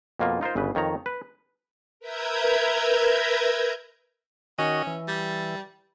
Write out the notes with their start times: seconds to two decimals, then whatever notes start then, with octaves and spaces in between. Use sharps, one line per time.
0.19 F2 B2 A#3 F4
0.41 D#4 F4 A#4 C5
0.56 G1 C#3 B4
0.75 F2 D#3 C#5 A#5
1.06 B4
2.00 A#4 B4 E5 A#5 G6 G#6
4.59 D#3 C#4 F#4 D#5
4.87 E3
5.08 G3